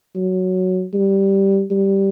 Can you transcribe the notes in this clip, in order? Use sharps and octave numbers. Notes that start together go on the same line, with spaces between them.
F#3
G3
G3